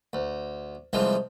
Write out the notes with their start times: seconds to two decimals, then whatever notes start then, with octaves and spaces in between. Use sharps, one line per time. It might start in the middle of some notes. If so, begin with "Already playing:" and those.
0.13 D2
0.93 C2 E3 F3 G#3